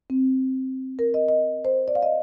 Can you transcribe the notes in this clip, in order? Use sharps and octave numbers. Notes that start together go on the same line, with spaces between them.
C4
A#4
D#5
D#5
C5
D5
F5
D#5